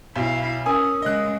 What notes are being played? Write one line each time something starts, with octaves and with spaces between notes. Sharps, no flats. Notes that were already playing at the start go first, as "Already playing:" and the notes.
B1 E4 F5
C#4 A#4 G#5 D#6 E6
C#3 G#3 D#5 F#6